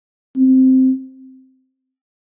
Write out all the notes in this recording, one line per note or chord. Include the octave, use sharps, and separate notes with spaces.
C4